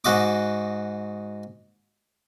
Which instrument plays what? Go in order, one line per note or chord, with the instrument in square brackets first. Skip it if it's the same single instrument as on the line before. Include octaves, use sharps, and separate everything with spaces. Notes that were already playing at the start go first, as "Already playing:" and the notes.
[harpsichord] G#2 F#4 D#5 D6